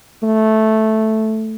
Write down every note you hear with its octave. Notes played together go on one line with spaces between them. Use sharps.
A3